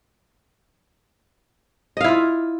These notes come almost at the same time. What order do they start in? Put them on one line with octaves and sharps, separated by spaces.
D#5 F5 E4 F4